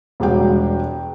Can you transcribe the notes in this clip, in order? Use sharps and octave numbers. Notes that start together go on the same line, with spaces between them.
E1 G3 G#3 F#4 G5